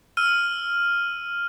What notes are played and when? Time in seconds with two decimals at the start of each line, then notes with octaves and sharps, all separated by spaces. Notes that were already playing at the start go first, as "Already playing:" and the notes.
0.17 E6 F6 D#7